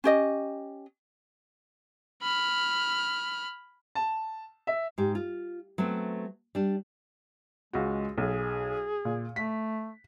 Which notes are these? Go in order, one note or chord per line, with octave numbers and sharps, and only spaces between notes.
C#4 G4 D#5
B5 F6
A5
E5
G#2 G4
F4
F#3 A3 B3 C4
G3 D4
C#2 G#3 F#4
B1 G#4
A#2
A3 B6